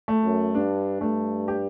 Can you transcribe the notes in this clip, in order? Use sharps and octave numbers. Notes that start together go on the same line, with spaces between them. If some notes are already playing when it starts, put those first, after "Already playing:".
A3
F#2
G2 D4
G2 A3
G4